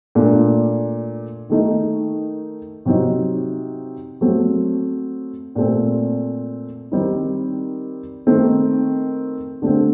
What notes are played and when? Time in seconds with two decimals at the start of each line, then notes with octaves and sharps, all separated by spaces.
0.15 A#2 A3 D4
1.49 D#3 A3 D#4
2.85 C3 F#3 C4 D#4
4.21 F#3 A3 C4
5.56 A#2 A3 C4
6.92 D#3 G3 C4 D#4
8.26 D#3 A3 C4 D#4
9.62 D3 A3 C4